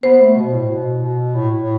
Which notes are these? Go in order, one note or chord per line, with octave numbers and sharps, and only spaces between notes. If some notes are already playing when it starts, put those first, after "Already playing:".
B3 C5
A3
B2
A2
B2
B2
A2
A2